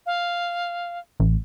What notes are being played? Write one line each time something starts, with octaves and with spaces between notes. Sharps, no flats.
F5
A1